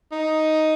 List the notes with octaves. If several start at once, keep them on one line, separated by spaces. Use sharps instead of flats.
D#4